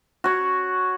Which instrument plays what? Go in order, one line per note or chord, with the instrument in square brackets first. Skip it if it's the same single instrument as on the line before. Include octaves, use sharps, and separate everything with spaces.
[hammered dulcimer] F#4 C#5